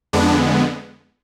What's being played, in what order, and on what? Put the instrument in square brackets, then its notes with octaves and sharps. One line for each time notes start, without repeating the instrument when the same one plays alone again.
[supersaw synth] F2 D3 G#3 B3 D4